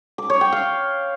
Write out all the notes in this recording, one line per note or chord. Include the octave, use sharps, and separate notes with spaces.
D6
C#5
G5
F5